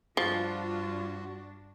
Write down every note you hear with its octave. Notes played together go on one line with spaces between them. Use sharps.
G2 F3 D4 F4 F#4